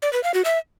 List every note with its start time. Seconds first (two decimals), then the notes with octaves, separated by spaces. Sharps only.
0.02 D5
0.13 B4
0.24 F5
0.34 F#4
0.45 E5